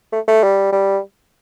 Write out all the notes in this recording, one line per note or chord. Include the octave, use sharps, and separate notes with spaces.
A3
A3
G3
G3